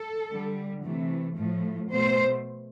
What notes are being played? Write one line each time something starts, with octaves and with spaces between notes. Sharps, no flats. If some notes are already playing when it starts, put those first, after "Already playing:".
Already playing: A4
D3 G3
C3 E3 A3
A2 F3 A3
B2 A3 C5